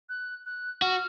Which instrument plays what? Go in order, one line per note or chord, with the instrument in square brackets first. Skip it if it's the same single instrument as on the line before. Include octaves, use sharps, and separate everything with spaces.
[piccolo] F#6
F#6
[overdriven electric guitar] F#4 [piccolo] F6